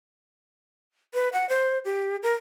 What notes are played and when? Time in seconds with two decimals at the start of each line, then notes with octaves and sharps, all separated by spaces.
1.14 B4
1.33 F#5
1.49 C5
1.85 G4
2.23 A#4